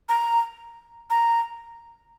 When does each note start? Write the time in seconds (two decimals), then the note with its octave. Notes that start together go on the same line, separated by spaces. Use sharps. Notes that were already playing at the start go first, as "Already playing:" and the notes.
0.09 A#5
1.10 A#5